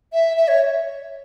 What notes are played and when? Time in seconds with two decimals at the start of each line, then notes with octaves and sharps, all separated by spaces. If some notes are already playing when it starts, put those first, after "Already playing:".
0.13 E5
0.37 E5
0.48 C#5